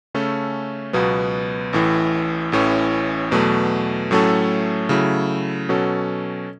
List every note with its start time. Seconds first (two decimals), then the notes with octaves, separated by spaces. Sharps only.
0.14 C#3 A3 C#4 A4
0.93 C#2 B2 F#3 B3
1.73 A1 A2 E3
2.52 A1 A2 E3 C#4
3.31 E2 B2 F#3 A3
4.11 A2 F#3 A3 C#4 A4
4.89 C#3 F#3 A3 E4
5.69 B2 F#3 C#4 A4